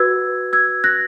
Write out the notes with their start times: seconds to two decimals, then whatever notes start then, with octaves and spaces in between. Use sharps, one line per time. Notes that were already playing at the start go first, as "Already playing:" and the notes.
Already playing: F#4 B4 E6 G#6
0.53 E6 G#6
0.84 F#6 A#6